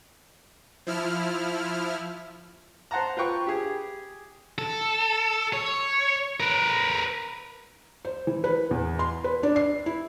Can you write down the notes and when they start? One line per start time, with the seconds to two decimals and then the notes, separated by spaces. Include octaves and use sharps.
0.87 F3 E4 F6
2.91 C5 F#5 A5 A#5
3.17 F4 B4 G5 C#6
3.47 G4 G#4
4.58 A4
5.53 C#5
6.40 A#4 B4
8.05 C5
8.27 E3
8.44 B4
8.71 E2
8.99 C6
9.24 B4
9.43 D4
9.56 C7
9.86 E4